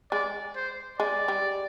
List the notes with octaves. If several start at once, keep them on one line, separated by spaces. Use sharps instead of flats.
G#3 D5
C5
G#3 D5
G3